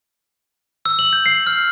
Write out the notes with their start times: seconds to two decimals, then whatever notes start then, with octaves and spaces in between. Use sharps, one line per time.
0.86 E6
0.99 F#7
1.13 G6
1.26 C7
1.47 F6